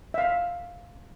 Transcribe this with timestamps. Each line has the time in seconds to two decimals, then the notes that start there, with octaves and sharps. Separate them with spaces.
0.14 E5 F5